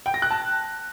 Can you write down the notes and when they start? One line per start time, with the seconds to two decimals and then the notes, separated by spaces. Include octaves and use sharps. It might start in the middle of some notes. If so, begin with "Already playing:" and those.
0.06 G5
0.14 A#6
0.22 F#6
0.31 A5